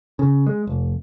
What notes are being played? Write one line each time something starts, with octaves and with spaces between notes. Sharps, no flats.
C#3
G#3
F1